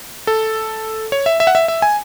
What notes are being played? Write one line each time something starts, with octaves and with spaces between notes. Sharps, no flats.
A4
C#5
E5
E5
F#5
E5
E5
G#5